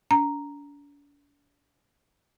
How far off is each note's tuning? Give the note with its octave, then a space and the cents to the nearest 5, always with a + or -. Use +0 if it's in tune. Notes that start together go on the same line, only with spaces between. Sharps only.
D4 -40 A#5 +0